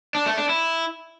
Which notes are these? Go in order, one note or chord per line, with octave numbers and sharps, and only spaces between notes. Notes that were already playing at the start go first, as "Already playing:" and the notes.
D4
A3
D4
E4